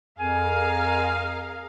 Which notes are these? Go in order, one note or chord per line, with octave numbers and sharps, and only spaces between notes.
F2 G#4 A#4 F5 G#5